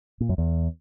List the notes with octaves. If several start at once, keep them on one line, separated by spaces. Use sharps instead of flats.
A#2
F#2
E2